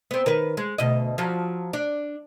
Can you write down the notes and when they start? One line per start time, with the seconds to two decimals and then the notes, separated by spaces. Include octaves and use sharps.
0.11 B3 C4
0.26 D#3 A#4 B4
0.57 G#3
0.78 D2 B2 D#5
1.18 F3 F#3
1.73 D4